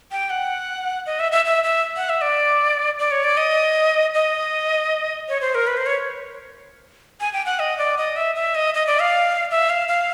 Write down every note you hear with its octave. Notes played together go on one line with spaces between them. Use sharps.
G5
F#5
D#5
E5
E5
E5
E5
F#5
E5
D5
D5
C#5
D5
D#5
D#5
C#5
C5
A#4
B4
C5
C#5
G#5
G5
F#5
D#5
D5
D#5
E5
E5
D#5
D#5
D5
F5
E5
F5
F5